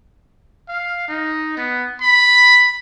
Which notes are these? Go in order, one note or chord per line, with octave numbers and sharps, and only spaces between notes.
F5
D#4
B3
B5